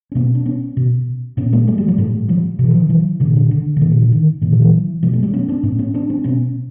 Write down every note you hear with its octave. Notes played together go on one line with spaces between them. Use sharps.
C#4
B2 A#3 C4
D4
B3 C#4
B2
A#2 B3 C#4
G#3 A#3
G3 A3
F#3 G#3
F3 G3
A2 G3 A3
F3 G3
B2 E3
D#3 F3
E3 F#3
A#2 D3 E3
D3
D3
D3
A#2 D#3
D#3
D3
D#3
A#2 D#3
D#3 F3
E3 F#3
B2 F3 G3
G3 A3
F#3 G#3
B3 C#4
C4 D4
A2 B3 C#4
B3 C#4
C4 D4
C4 D4
B2 B3 C#4